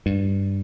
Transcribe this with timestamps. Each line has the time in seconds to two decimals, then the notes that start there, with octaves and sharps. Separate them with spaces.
0.06 G2